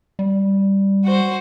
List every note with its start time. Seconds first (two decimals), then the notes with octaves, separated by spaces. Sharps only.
0.19 G3
1.05 F#4 C5